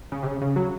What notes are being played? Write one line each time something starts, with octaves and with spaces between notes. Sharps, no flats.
C#3
C3
C#3
C#3
F#3